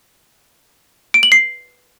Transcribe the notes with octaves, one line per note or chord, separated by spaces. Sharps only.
D7
F#7
C7